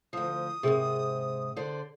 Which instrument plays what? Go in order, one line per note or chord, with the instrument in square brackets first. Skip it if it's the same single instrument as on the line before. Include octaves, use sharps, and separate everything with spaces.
[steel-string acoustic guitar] D2 F3 [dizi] D#6
[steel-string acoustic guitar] G#2 C3 [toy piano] G4 G#4 A#4
[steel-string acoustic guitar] D3 C5 D5